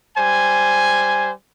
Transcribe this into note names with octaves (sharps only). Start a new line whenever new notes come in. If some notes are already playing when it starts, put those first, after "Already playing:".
G3 C5 G#5